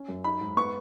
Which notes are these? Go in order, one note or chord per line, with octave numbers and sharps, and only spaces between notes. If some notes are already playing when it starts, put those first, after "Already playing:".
Already playing: C#4
F#2
D#4 B5
G#2
B3 C#6